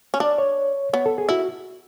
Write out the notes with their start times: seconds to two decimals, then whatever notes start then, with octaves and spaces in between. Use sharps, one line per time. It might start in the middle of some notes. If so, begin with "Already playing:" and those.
0.14 C#4
0.20 D4 D5
0.38 C#5
0.93 B3 C#5
1.06 A4
1.18 G#4
1.29 E4 F#4